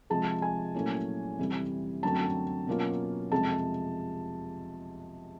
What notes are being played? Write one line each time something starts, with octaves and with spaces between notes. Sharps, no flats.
C3 F3 G#3 A5
G#5
A#2 F#3 A3 C#4 E4
F2 C3 E3 G3
F#2 D3 F#3 A3 C4 A5
B2 F#3 A#3 C#4 F4
F2 C3 F3 G#3 A5